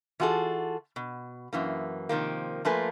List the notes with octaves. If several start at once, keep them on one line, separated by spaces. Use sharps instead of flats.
E3 F4 F#4 G#4 A4
B2
F#2 E3 A#3
C3 D#3 F3 A#3
F3 A3 A#3 F4 B4 G#5